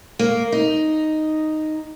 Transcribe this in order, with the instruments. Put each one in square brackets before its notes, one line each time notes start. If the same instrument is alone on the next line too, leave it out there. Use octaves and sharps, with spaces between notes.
[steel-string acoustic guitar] A#3
D#4